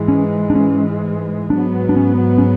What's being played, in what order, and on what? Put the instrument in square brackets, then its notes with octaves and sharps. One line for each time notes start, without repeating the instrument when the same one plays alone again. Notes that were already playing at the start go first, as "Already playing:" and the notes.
Already playing: [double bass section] G#2 E3 G#3
[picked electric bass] C#4
D4
C#4
[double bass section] G#2 F#3 B3 [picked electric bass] D4
[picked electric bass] D4
C#4
C#4